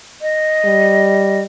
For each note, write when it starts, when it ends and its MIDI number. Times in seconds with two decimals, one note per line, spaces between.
0.22 1.41 75
0.65 1.43 55